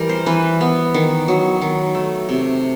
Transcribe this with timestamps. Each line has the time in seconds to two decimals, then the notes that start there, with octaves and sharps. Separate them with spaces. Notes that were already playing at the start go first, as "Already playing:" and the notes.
Already playing: E3 G3 A#4
0.09 C5
0.26 E3 B4
0.61 B3
0.94 D#3
1.28 F#3
1.62 D#3
1.95 A3
2.29 C3